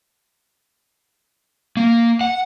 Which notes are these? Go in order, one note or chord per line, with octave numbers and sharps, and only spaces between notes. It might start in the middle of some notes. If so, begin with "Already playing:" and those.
A#3
F#5